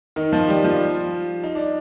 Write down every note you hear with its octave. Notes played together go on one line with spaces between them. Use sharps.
D#3 D#4
F3 F4
G3 G4
F3 F4
D#4
D4